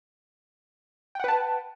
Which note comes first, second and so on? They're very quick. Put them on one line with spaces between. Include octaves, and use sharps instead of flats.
G5 F#5 B4 A5